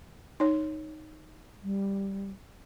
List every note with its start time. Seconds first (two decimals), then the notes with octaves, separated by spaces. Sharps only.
0.40 D#4 C#5
1.63 G3